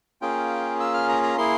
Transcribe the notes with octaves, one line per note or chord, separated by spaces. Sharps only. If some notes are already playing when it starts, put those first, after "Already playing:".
A#3 C#4 F4 G#4 G5
E6
F6
A#5
A#5
A#3 E4 G#4 C6